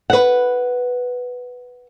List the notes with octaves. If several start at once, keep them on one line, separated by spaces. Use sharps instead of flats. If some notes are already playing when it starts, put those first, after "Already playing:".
B4 F#5